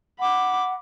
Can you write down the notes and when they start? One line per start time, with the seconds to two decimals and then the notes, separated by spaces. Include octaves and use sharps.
0.20 F#5 B5 D6